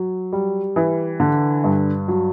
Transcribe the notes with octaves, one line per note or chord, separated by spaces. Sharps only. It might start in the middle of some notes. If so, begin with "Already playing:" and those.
Already playing: F#3
G3
E3
D3
G2
F#3